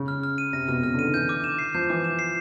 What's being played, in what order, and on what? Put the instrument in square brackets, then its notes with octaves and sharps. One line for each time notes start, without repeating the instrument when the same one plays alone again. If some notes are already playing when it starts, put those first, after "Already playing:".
Already playing: [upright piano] C#3
[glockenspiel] F6
F6
D#7
[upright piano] C3 [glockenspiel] A#6
[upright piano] B2 [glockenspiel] F6
[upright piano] C#3 [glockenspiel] F6
[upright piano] D3
[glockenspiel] D#7
[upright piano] D#3
[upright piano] E3 [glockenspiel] G6
[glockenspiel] D6
E7
C7
[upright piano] F3 [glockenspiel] G6
[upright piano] E3 [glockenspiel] D6
[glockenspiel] E7
C7